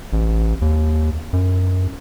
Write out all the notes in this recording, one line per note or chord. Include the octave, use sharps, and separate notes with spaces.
A1
D#2
F#2